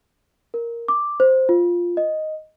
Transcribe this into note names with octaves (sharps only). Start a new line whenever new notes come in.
A#4
D6
C5
F4
D#5